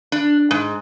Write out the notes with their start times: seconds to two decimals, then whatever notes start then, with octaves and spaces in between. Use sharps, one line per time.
0.12 D4
0.51 G#2